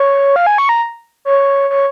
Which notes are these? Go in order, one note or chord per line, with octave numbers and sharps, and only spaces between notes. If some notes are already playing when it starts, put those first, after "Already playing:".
Already playing: C#5
F5
G#5
C#6
A#5
C#5
C#5